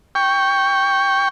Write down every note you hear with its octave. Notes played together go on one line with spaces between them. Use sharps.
G5 C#6